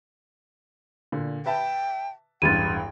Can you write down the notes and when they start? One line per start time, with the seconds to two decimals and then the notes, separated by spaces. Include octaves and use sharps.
1.12 A#2 D3
1.46 B4 E5 G5 A5
2.42 E1 A1 G2 G5 A6 D#7